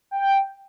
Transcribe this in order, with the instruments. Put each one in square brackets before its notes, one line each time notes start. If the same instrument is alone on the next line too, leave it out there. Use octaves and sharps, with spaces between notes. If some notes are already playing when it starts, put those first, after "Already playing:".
[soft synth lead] G5